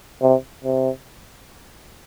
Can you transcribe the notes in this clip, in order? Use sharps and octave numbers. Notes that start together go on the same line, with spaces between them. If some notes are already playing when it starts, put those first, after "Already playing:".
C3
C3